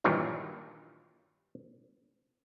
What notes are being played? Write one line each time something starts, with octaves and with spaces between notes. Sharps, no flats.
G2 A#2 D#3 E3 F#3